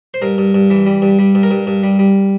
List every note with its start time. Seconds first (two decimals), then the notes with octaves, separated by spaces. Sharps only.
0.14 C5
0.22 G2 A#4
0.38 G2
0.54 G2
0.70 E3
0.86 G3
1.02 G2
1.19 G3
1.35 G2
1.43 A#4
1.51 G2
1.67 G2
1.83 G3
1.99 G3